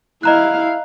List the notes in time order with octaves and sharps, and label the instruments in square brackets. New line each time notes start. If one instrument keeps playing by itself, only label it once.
[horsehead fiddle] E4 F5 [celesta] D#5 A#5 F#6